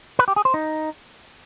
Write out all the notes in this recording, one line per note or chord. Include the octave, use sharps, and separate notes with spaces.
B4
G4
G#4
C5
D#4